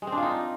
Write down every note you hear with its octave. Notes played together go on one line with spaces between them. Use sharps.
G#3
C4
D4
F4
D#4